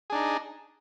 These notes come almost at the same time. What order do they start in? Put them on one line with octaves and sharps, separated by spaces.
G#4 D4 D#4